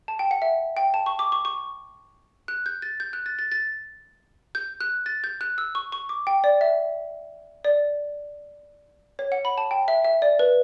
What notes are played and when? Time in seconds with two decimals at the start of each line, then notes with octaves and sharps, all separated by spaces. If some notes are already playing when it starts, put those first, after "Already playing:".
0.08 A5
0.19 G5
0.31 F#5
0.42 E5
0.77 G5
0.94 A5
1.06 C#6
1.19 D6
1.32 C#6
1.45 C#6
2.48 F#6
2.66 G6
2.82 A6
3.00 G6
3.13 F#6
3.26 A6
3.39 A6
3.52 A6
4.55 G6
4.80 F#6
5.06 A6
5.24 G6
5.41 F#6
5.58 E6
5.75 C#6
5.92 C#6
6.09 D6
6.27 G5
6.44 D5
6.61 E5
7.64 D5
9.19 C#5
9.32 F#5
9.45 B5
9.58 A5
9.71 G5
9.88 E5
10.04 E5
10.22 D5
10.39 B4